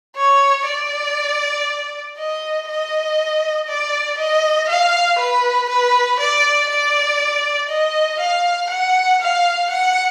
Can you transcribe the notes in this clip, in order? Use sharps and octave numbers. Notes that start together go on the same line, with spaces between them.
C#5
D5
D#5
D#5
D5
D#5
F5
B4
B4
D5
D5
D#5
F5
F#5
F5
F#5